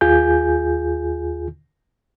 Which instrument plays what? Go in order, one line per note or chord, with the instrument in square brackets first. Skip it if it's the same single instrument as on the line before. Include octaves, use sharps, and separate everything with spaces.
[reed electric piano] D#2 F4 G#4 G#5 G6